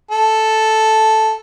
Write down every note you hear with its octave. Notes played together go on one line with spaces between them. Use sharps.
A4